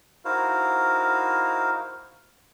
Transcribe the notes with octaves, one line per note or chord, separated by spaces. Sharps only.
D#4 E4 F#4 A#4 C5 F5